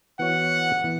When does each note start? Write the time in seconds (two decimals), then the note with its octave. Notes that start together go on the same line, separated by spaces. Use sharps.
0.19 E3 B3 F#4 C#5 F#5
0.84 E3 B3